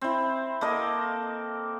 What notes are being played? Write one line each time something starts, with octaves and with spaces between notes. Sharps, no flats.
C4 E4
A#3 A4 D#5